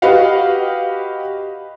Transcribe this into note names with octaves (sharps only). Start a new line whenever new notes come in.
F#4 G4 B4 D#5 F5 F#5